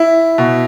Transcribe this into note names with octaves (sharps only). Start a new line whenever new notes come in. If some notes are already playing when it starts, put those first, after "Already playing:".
Already playing: E4
B2